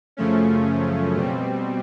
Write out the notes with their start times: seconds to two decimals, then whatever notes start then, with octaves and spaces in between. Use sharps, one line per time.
0.17 F#2 C#3 F3 A3 C#4
1.15 B2 G3 C4